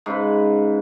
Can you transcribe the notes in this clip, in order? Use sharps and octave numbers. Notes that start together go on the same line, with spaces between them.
G#2 C#3 B4